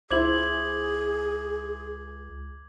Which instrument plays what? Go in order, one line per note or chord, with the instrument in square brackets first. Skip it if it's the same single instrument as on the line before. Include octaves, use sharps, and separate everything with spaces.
[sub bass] C#2 [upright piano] E4 C5 [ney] G#4 [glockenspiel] D6 G#6 F#7